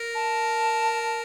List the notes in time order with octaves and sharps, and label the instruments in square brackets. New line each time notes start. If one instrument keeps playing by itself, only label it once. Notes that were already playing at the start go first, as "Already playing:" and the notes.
Already playing: [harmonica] A#4
[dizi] A5